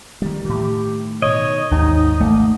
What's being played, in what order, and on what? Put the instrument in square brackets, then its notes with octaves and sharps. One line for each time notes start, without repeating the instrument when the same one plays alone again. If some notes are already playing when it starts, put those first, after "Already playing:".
[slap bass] D#3 G3
[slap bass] A2 D#3 [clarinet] G4
[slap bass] B2 D#3 [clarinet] C#5 [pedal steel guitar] D#5
[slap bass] G#1 D#3 [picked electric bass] D#2 [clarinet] D#4
[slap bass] G#1 [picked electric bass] A3 [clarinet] A#3